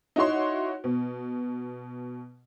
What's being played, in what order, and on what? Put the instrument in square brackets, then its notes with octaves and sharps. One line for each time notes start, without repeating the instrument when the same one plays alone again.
[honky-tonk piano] D#4 E4 F#4 C#5 C6
B2